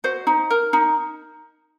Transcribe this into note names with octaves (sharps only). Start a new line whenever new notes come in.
F#4 C5
D#4
A#4
D#4